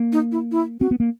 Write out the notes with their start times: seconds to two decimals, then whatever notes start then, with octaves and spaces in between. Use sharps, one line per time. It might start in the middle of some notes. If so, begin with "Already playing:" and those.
Already playing: A#3
0.12 D#4
0.32 E4
0.51 E4
0.80 C4 F#4
0.91 B3
1.00 A#3